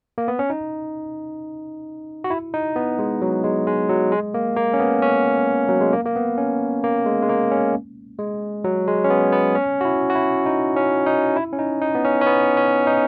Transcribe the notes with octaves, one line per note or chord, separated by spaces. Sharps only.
A#3
B3
C#4
D#4
F#4
E4
D#4
B3
G#3
F#3
G#3
G#3
F#3
G#3
A#3
A#3
C#4
B3
C#4
F#3
G#3
A#3
A#3
B3
C#4
A#3
G#3
G#3
A#3
C#4
G#3
F#3
G#3
C#4
B3
B3
C#4
F#4
E4
F#4
E4
D#4
C#4
D#4
E4
C#4
D#4
D#4
B3
C#4
C#4
B3
C#4
D#4